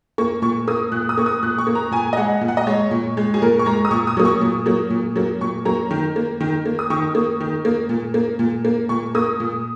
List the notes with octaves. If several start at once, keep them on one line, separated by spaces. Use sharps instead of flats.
A#3 C#6
A#2 C#6
A#3 D#6
A#2 F#6
D#6
A#3 C#6
D#6
A#2 F#6
C#6
A#3
A#5
A#2 G#5
D#5
G#3 F#5
A#2
F#5
D#5
G#3 C#5
A#2
G#3
G#4
A#2 A#4
C#6
G#3 A#5
D#6
A#2 C#6
D#6
F#3 A#3
C#6
A#2
F#3 A#3
A#2
F#3 A#3
A#2 C#6
F#3 A#3 A#5
D#3
A#3
D#3
A#3
D#6
D#3 C#6
A#3
D#3
A#3
A#2
A#3
A#2
A#3
A#2 C#6
A#3 D#6
A#2